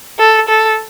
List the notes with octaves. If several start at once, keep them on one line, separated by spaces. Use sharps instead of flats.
A4
A4